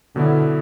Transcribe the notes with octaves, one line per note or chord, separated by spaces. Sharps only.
B2 D3 F#3 B3 E4